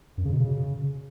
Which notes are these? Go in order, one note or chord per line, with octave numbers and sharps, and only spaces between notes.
F#2
C#3
B2
C#3